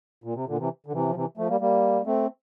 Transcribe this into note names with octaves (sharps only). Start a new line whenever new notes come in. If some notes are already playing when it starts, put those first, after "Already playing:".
A#2
C3
A#2 D3
C3 E3
D3
C3 E3
F3
C3 E3
F3 A3
G3 A#3
G3 A#3
A3 C4